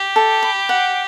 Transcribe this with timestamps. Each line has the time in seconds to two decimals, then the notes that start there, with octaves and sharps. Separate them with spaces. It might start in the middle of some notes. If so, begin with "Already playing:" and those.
Already playing: G4
0.16 A4
0.43 B5
0.69 F#5